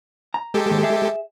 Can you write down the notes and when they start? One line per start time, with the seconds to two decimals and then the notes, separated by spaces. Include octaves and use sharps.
0.34 A#5
0.54 G#3 G4 A4
0.70 D#2 G#2
0.83 G#4 E5